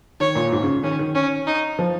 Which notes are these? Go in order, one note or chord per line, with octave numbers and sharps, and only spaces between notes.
D#3 C#5
A#2
G#2
C#3
D#3 C#4
D#3
C#4
D#4
F3